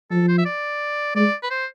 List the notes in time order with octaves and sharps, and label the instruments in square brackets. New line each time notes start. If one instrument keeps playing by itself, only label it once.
[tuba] F3 [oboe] A4
[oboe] C5
E5
D5
[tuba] G#3 [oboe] D5
[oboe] B4
C5